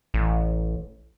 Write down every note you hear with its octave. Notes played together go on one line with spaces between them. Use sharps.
A1